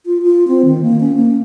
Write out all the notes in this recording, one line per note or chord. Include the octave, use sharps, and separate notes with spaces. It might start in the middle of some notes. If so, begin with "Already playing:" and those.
F4
F4
C4
D#3
A#3
C#4
A#3